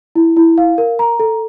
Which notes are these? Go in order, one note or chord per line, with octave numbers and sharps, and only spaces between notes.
E4
E4
F5
A#4
A#5
A4